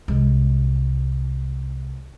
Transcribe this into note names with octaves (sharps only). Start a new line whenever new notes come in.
C2 G#3